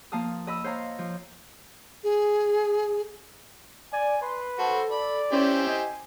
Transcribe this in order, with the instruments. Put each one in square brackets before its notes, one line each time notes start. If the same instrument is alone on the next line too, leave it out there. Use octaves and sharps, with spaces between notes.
[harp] F3 A#3 F5 A5 D#6
D#5 B5 D#6 E6
C5 C#5 F5 A#5
F3
[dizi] G#4
[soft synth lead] D5 [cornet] G#5
[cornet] B4 [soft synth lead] C6
[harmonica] F#4 C5 [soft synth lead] A4
[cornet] D5 [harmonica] B5
[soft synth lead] C#4 [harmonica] E4 G4 C5
[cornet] D#5 [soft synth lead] G#5